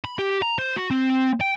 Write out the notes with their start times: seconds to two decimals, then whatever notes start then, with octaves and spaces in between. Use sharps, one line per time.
0.05 B5
0.19 G4
0.42 A#5
0.59 C5
0.76 F#4
0.91 C4
1.41 G5